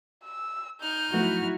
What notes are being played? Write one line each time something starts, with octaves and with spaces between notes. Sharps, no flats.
E6
D#4 F6 G6
F3 F#3 A3 B3 E4 F#4